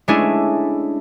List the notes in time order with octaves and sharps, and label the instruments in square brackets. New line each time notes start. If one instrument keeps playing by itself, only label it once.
[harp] G#3 A3 C#4 D4 E4 G#4